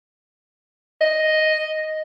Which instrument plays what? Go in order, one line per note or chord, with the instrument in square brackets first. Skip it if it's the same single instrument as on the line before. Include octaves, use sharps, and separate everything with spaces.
[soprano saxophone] D#5